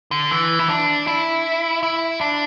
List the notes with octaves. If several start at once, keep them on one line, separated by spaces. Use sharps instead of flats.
D3
E3
E4
D4
E4
E4
D4